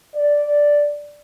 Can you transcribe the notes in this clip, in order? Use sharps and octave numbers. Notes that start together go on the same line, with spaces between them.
D5